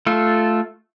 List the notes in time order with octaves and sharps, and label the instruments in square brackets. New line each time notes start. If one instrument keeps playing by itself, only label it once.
[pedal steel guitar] A3 F4 A4